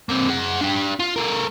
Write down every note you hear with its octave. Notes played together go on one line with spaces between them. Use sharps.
A#3 C4
G#4 F#5
D4 G4
F4
A3 A#4